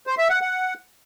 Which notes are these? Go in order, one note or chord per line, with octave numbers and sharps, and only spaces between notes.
C5
E5
F#5
F#5